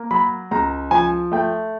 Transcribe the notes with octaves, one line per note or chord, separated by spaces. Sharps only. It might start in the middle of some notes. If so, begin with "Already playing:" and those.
Already playing: A#3
F#3 B5
C#2 A#5
F3 G#5
A3 G5